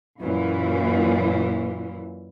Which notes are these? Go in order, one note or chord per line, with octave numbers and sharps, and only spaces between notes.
F#2 A#2 E3